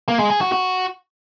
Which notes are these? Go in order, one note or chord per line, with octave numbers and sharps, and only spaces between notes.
A#3
G#3
G#4
F#4
F#4